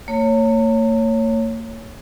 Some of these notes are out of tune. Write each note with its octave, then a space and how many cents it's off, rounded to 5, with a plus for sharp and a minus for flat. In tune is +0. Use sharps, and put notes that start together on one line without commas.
A#3 -45 C#5 +0